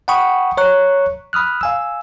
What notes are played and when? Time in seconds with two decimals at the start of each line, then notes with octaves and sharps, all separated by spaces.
0.08 F#5 G5 B5 C#6 D#6
0.57 C#5 A#5 C#6 F#6
1.33 B5 D#6 F6 F#6
1.61 F5 G#5 E6